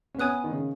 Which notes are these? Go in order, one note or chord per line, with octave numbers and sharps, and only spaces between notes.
C#4
B3 C#5 G#5 D#6 F#6
D#3
C#3